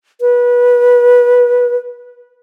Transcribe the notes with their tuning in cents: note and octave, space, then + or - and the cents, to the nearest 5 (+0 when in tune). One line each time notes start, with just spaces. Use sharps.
B4 -20